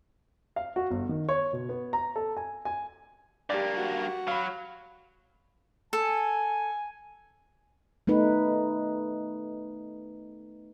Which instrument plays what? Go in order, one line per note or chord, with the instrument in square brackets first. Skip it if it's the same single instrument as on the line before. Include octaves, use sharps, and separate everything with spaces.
[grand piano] F5
F#4
G1
D#3
C#5
B2
B3
A#5
A4
G#5
G#5
[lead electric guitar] G2 A#3 [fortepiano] G4 D5
[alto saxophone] F#4
[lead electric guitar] F#3 [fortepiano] F5 B5
[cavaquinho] A4 [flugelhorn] G#5
[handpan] A3 B3 D#4 B4